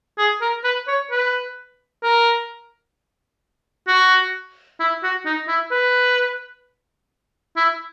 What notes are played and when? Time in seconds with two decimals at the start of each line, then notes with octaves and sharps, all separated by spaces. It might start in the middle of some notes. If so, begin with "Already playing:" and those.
0.18 G#4
0.41 A#4
0.64 B4
0.88 C#5
1.11 B4
2.03 A#4
3.88 F#4
4.80 E4
5.03 F#4
5.25 D#4
5.48 E4
5.71 B4
7.56 E4